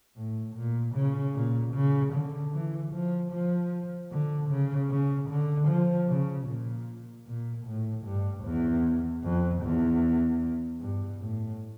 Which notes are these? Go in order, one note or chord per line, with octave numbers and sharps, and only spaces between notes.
A2
A#2
C#3
A#2
C#3
D3
E3
F3
F3
D3
C#3
C#3
D3
F3
C#3
A#2
A#2
A2
G2
E2
F2
E2
G2
A2